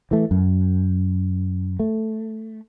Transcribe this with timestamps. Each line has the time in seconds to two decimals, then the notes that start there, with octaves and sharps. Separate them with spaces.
0.11 E3 A3
0.31 F#2
1.80 A3